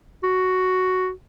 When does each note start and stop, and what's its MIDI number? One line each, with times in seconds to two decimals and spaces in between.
0.23 1.11 66